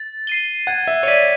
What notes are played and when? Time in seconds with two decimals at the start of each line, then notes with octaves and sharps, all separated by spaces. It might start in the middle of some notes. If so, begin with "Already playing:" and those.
Already playing: A6
0.27 C7 D#7 G7
0.67 F#5 G#6
0.88 E5
1.03 C#5
1.07 D5 B6 D#7